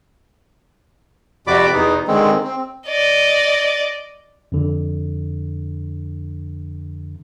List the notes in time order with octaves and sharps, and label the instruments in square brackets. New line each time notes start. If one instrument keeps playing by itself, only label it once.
[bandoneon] F2 C3 F#4 D5 B5 D6
E2 B2 B3 D#4
D3 D#3 G#3 C4
C4
[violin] D5 D#5
[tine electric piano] F2 D3